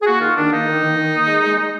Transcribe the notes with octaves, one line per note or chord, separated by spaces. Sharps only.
G#4
A#3 F#4
D#3 F4
D#3 D4
A#3 D#4
D#3
D#3
D#3
A#3
G#3
G#3
G#3